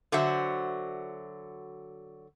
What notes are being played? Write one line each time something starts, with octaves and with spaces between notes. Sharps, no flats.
D3 F#3 F#4 C5 E5